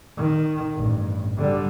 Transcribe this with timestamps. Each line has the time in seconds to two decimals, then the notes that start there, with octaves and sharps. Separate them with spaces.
0.17 D#3
0.75 A1 G2
1.38 D3 G3